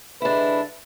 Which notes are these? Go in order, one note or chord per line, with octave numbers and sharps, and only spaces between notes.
D3 G#3 D4 E4 B4